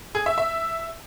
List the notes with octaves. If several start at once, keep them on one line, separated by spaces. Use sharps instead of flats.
G#4
E5
E5